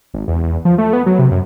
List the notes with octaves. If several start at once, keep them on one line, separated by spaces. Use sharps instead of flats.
G#1
E2
E2
F3
A3
B3
F#3
C3
F#2